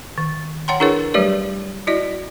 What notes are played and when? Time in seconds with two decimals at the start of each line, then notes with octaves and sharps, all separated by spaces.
0.18 D#3
0.68 C#5 F#5 G5 A#5 C6
0.80 D4 E4 G#4 A#4 B4 C#5
1.14 F#3 G3 A3 G4 B4 C#5
1.87 E4 F#4 D5 D#5